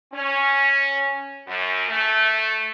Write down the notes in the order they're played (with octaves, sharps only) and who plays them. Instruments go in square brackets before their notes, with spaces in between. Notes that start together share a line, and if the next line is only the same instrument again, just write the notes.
[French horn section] C#4
F#2
A3